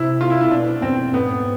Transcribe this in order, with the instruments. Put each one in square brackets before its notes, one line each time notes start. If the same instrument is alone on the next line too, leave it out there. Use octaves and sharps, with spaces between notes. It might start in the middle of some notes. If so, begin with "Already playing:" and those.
Already playing: [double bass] C3 [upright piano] E4
[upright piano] F4
E4
E4
[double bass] B2 [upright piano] D4
[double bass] E2 [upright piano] C4
[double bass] G#2 [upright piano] B3